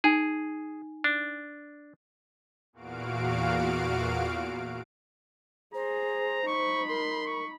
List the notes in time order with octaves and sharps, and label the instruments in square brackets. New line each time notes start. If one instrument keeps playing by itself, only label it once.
[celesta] D#4 G#5 [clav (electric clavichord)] G#4
[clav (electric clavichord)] D4
[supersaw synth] E2 A#2 F#4 F5 D7
[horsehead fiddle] G#4 [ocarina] C5 [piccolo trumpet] A#5
[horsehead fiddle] D#4 B5 [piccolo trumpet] C#6
[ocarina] A#4 [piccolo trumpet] C6
[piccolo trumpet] C#6